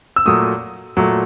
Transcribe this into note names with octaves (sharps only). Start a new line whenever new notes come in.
E6
A#2 F#3 A3 D#6
A#2 F#3 A3